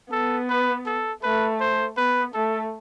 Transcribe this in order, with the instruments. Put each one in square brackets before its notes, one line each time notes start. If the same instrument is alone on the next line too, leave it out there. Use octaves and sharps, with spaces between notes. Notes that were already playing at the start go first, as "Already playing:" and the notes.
[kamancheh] B3 [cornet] A4
[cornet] B4
A4
[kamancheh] A3 [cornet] B4
[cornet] C5
[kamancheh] B3 [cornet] B4
[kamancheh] A3 [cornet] A4